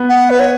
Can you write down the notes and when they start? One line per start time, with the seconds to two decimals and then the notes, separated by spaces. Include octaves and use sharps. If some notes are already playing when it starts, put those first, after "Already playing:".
Already playing: B3
0.09 F#5
0.30 B4
0.40 C#5